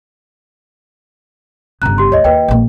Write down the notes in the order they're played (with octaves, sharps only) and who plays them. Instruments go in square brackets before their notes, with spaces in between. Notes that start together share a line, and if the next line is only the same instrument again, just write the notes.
[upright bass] G1 C#3 [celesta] A#5 F#6
[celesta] G4 C6
[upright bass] D2 [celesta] C#5 D#5
[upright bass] D#2 [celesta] B4 D#5 G5
[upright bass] A#1 A#3